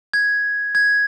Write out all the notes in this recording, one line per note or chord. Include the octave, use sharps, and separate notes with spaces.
G#6
G#6